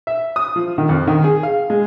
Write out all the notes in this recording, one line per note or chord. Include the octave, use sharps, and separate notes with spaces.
E5
D#6
F3
D#3
F2
D#3
G#4
F5
G#3